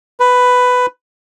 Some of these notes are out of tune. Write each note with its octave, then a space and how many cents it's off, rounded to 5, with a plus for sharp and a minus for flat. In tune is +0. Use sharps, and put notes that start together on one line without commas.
B4 +10